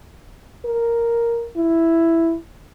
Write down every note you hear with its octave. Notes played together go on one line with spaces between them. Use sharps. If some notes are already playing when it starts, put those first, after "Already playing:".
A#4
E4